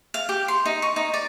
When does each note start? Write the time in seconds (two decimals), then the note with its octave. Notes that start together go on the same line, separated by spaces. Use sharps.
0.14 F5
0.29 G4
0.48 C6
0.66 D#4
0.82 C#6
0.96 D#4
1.14 D5